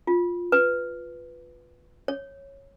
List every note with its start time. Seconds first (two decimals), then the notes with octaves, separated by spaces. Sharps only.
0.07 F4
0.52 B4
2.08 C#5